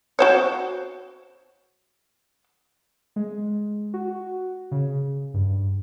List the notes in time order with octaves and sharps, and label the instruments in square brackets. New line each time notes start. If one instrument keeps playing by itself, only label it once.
[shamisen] F#4 C5 C#5
[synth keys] G#3
F#4
C#3
G2